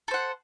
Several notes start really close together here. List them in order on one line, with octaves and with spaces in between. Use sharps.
A4 C5 F#5